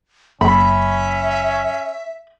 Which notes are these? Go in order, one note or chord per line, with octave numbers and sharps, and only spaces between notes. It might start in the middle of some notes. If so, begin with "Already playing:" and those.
F#1 C#4 E5 B5